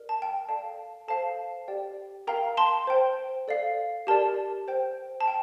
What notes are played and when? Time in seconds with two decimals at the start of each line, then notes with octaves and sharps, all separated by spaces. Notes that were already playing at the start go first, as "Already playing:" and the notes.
Already playing: A#4 D5
0.09 A5
0.22 G5
0.29 A5
0.48 A4 D5 F5 A5
1.08 A4 C5 F5 A5
1.68 G4 D5 G5
2.27 A#4 F5 G5 A#5
2.57 A5 C6
2.87 C5 G5
3.48 A4 D5 F5
4.07 G4 A#4 D5 A5
4.68 C5 G5
5.21 A5
5.28 G5